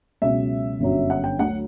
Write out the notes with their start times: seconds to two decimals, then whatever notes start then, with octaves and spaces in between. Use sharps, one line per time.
0.22 C#2 B2 F#3 E5
0.80 G1 F#2 D3 F#3
1.10 F#5
1.24 G5
1.39 D2 D3 F#3 F#5